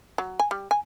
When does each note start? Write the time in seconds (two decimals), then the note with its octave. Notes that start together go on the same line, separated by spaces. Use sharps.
0.18 F#3
0.39 G#5
0.51 G3
0.71 G#5